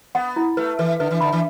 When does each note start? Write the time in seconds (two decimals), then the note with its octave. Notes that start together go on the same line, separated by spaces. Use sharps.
0.15 B3 F#5
0.36 E4
0.57 A3 B4
0.79 E3 B4
1.00 D3 B4
1.11 E3
1.21 D3 B5
1.32 E3